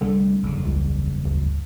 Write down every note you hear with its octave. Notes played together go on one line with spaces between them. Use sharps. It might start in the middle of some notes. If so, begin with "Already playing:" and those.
C2 D3 G3 A3
F#1 E2 G2
C#2
D2